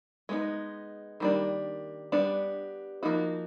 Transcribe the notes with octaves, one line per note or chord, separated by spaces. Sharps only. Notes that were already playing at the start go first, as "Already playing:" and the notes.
G#3 B3 D#4
D#3 G3 A#3 D4
G3 B3 D4
F3 A#3 D#4 F#4